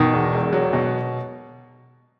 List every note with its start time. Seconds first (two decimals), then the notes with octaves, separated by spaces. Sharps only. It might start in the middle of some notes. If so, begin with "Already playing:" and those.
Already playing: B2 D#3
0.13 E2
0.33 E1
0.53 F#3
0.73 B2